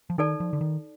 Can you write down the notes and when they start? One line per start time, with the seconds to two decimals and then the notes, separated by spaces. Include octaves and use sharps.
0.10 F3
0.18 D#3 D#4 A4 D5 A5
0.40 F3
0.53 D3
0.61 D#3